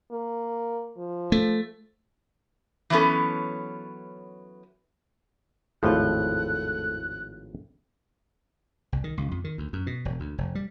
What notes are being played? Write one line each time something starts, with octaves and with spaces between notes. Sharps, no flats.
A#3
F3
A3
E3 F#3 B3 C#4 A4
G#1 E2 A2 F3 A3 E4 F#6
C2
D#3
C#2
F2
D#3
D2
F#2
B2
E1
D2
F1
G3